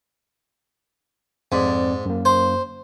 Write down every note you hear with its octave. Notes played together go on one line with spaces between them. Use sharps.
F2 G#2 C4 D5
F#2 A#3
C5